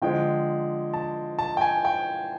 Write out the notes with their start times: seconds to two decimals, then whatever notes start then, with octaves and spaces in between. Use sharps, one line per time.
0.02 D3 F3 G#3 G5
0.94 A5
1.39 A5
1.57 G5
1.61 G#5
1.85 G5